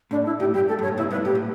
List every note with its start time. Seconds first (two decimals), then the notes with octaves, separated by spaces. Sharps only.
0.11 A2 D4
0.26 E4
0.39 A2 G4
0.54 G2 G4
0.68 A4
0.79 G2
0.83 C#5
0.88 A2
0.97 G2 B2 E4
1.11 G2 B2 B4
1.25 A2 G4
1.35 A2